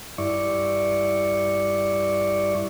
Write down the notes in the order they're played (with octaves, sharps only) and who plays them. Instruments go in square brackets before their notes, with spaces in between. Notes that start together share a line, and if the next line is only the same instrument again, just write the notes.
[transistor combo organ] G2 E4 D5 C#6